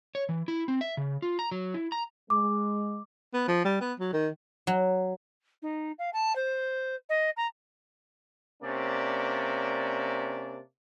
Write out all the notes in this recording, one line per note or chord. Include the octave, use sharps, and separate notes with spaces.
C#5
E3
E4
C4
E5
C#3
F4
A#5
F#3
E4
A#5
G#3 D6
B3
F3
G3
B3
F#3
D#3
F#3
D#4
F5
A5
C5
D#5
A#5
C3 A#3 C#4 D4 D5